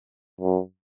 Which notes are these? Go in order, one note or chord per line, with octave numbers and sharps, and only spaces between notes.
F#2